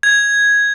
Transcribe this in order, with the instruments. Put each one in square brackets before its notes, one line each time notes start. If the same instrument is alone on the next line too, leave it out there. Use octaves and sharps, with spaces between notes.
[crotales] G#6